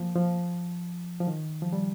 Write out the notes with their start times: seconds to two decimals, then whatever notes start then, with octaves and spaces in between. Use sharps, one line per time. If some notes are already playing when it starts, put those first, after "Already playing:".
Already playing: F3 A#3
0.15 F3
1.20 F3
1.27 D#3
1.62 F3
1.73 G3